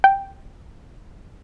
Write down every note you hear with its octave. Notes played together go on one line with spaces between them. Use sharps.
G5